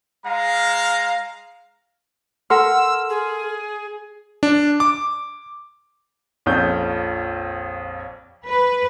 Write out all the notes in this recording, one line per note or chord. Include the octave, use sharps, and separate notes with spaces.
G#3 F5 A#5
A4 A#4 F#5 C6 E6 F6
G#4
D4
D6
A#1 F2 C#4 G6
B4